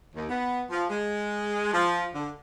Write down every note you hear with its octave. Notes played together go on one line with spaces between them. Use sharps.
D#2
B3
F3
G#3
F3
D3